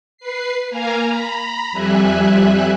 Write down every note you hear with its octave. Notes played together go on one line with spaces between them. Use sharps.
B4 C7
A#3 F5 G#5 A#5
A#5 B5
F2 G3 E5 G#5 F#6